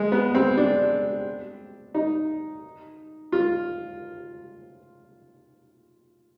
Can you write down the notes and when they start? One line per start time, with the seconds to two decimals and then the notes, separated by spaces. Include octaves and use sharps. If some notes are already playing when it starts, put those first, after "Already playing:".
Already playing: G#3
0.12 B3
0.35 C4
0.57 D4
1.94 D#4
3.32 F4